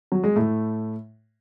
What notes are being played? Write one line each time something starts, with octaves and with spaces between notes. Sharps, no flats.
F#3
G#3
A2 A3